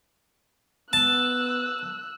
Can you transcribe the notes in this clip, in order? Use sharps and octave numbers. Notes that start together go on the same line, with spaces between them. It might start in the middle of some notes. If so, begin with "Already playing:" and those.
B3 A5 E6 F#6